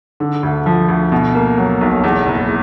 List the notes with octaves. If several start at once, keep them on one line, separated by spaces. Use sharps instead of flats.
D3
D2
F3
D2
B2
A#3
F#3
B1
E2
F#1